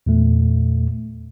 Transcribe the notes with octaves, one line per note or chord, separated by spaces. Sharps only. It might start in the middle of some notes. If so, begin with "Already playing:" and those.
E2 A#2 A3